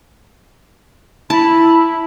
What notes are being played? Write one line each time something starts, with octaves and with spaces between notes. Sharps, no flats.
E4 A5 B5